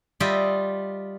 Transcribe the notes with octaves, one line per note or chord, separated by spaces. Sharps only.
G3 F4 D#5 E5 G5